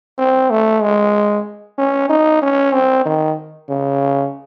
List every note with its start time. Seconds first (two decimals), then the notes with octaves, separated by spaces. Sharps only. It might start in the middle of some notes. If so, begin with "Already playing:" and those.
0.18 C4
0.50 A3
0.82 G#3
1.78 C#4
2.09 D#4
2.42 C#4
2.73 C4
3.05 D#3
3.69 C#3